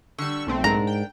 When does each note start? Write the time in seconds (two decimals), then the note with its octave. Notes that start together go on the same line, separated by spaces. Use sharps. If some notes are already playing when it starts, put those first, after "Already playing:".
0.18 D3 G3 C#6 E6
0.47 B1 A3 C4
0.64 G#2 D4 A#4 A#5
0.87 G5